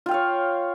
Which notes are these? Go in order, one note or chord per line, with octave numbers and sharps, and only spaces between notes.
F4 C#5 F5 G5